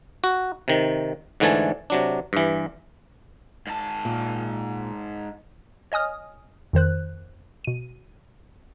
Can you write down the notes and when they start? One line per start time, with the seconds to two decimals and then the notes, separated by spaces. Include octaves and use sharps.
0.24 F#4
0.68 C3 D#3
1.40 G#2 D3 E3 A3 G#5 A5
1.90 C3 F#3 D4
2.33 G2 E3
3.67 G#2 A5
4.05 A#2
5.92 C#5 D#5 G#5 D#6 F6
6.73 F2 D#3 C5 F#6
7.64 B2 D#7